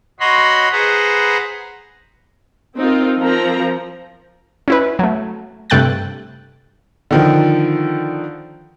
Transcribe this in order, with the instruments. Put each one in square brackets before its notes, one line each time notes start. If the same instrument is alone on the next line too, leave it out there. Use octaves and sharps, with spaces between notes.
[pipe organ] F#4 C#5 D#5 B5 C6
G#4 B4 C5 F#5 A#5
[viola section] C4 D#4 F4 A#4
F3 C4 A#4 A#5
[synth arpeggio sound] C#4 E4 B4
F#3 A3
G2 C3 A3 G5 F#6 A6
[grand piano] D3 D#3 F3